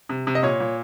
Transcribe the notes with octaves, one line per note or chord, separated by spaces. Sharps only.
C3
C3
D#5
A#2 C#5
A#2